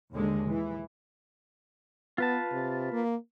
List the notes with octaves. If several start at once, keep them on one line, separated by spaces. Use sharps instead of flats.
D#2 D3 G#3
E3
B3 F4 B4 A5
C3
A#3